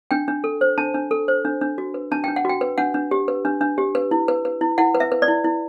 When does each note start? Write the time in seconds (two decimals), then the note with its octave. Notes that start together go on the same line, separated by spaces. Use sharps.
0.11 D4 G5
0.28 D4
0.44 A4
0.61 C5
0.78 D4 A5
0.94 D4
1.11 A4
1.28 C5
1.45 D4
1.61 D4
1.78 F#4
1.94 B4
2.11 D4 A5
2.24 D4 G5
2.36 F#5
2.45 F#4 G5
2.61 B4
2.78 D4 F#5
2.94 D4
3.11 G4
3.28 B4
3.45 D4
3.61 D4
3.78 G4
3.95 B4
4.11 E4
4.28 B4
4.45 B4
4.61 E4
4.78 E4 F#5
4.95 B4
5.00 E5
5.12 B4
5.22 D5
5.28 E4
5.44 E4